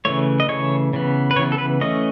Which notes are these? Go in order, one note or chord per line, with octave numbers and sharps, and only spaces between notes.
C#3 E3 A3 C#5
D#5
C#3 E3 A3 C#5
C#3 E3 B3
B4
C#3 E3 B3 C#5
A4
B4
E3 A3 C#4 D#5